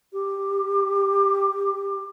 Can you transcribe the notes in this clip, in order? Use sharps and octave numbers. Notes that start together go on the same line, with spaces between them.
G4